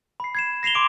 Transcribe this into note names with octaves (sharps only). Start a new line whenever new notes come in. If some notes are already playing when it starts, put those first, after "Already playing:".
B5 C7
G#6 C7 E7
A#6 C7 E7 F7 G7
C6 D6 D7